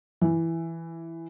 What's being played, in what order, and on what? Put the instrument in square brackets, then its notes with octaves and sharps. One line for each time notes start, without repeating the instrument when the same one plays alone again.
[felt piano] E3